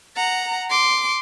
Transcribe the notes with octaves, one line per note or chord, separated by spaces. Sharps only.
F#5 A#5
C6 D6